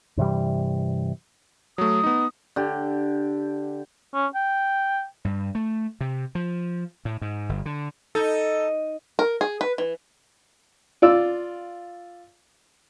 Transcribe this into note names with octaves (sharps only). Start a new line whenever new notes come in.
G2 C3 E3 G3
F#3 A3 D#6
B3 D#4
D3 G4
C#4
G5
G2
A3
C3
F3
A2
G#2
G1
D3
D#4 A4
A#4
G#4
B4
E3
F4 D5 E6